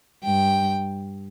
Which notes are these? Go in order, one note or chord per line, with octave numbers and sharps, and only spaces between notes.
G2 G5